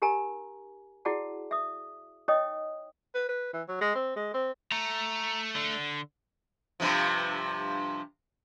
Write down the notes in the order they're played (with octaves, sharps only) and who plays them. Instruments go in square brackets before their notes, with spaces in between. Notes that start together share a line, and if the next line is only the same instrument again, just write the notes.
[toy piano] D#4 G4 A#4 G#5 A#5
E4 F#4 G#4 D5 F#5 A5
E5 D#6
D#4 C#5 D#5 G5 D#6
[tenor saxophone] B4
B4
E3
F#3
G#3
C4
G#3
C4
[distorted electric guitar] A3 [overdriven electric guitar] A#5
[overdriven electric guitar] D3
[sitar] G2 C3 F3